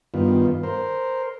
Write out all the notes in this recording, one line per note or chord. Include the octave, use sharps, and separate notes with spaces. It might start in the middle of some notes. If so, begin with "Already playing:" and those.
G2 D#3 B3 F4
A#4 C5